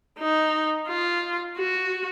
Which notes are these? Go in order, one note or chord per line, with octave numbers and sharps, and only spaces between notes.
D#4
F4
F#4